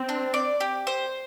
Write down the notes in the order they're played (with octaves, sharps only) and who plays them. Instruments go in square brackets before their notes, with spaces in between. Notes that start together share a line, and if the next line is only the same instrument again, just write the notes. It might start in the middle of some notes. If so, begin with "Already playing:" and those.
Already playing: [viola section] C4
[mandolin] D4
D5
G4
C5